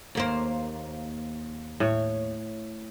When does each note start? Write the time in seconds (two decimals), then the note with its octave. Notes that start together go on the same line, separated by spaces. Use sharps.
0.15 D#2 A#3 C5
1.80 A2 C#5